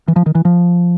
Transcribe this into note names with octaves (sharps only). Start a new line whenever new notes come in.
E3
F3
D#3
E3
F3